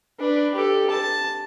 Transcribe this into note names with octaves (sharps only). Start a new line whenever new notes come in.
D4 B4
G4 A4
A5